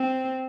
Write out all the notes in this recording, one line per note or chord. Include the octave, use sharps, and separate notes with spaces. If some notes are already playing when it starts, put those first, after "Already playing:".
Already playing: C4